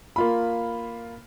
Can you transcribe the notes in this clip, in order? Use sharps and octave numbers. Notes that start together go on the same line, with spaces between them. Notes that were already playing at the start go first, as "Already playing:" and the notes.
A#3 F4 B5